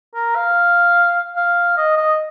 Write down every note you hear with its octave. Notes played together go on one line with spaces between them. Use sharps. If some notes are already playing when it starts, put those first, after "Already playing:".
A#4
F5
F5
D#5
D#5